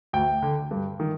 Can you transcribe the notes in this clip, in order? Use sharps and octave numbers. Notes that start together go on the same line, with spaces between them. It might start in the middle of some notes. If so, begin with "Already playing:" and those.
D2 G5
D3
G2
D#3